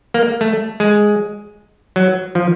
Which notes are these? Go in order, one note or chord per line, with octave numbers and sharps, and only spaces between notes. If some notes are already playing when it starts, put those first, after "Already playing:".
A#3
A3
G#3
F#3
F3